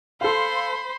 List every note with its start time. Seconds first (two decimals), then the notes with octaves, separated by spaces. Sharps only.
0.21 A4 C5 F5 B5 C6